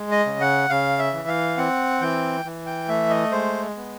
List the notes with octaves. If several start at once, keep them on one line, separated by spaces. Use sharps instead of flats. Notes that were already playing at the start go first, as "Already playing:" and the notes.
Already playing: G#3
D#5
C#3
F#5
C#3 F5
E5
E3
F5
C4 F#5
E3 G5
E3
G5
A3 E5
D#5
G#3 C5
B3